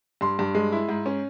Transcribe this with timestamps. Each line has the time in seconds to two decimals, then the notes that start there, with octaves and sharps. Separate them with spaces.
0.21 G2 C6
0.39 G2
0.55 G#3
0.72 E4
0.89 G#2
1.06 C#4